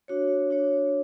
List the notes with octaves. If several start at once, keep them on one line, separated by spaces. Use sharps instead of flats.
D4 F#4 C#5
D4 F#4 C#5